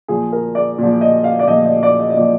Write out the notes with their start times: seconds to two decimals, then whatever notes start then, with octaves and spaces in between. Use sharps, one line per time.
0.08 A#2 F3 G#4
0.32 A#4
0.55 D5
0.78 A#2 F3
1.01 D#5
1.24 F5
1.39 D5
1.48 A#2 F3 D#5
1.65 D#5
1.83 D5
2.00 D#5
2.10 D#5
2.17 A#2 F3 D5